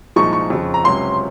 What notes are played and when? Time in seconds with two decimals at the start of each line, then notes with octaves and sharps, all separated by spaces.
0.16 C2 A#2 F3 G#3 D#4 C#6
0.33 C#6
0.50 F2 C#3 F3
0.74 A#5
0.84 C#2 C3 F#3 C#4 C6